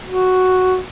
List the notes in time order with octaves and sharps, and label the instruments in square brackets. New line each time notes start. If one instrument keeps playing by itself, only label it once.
[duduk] F#4